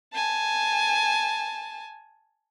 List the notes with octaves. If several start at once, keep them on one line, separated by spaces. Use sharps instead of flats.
G#5 A5